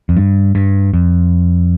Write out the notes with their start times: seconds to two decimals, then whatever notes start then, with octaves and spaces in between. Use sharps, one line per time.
0.09 F2
0.17 G2
0.55 G2
0.94 F2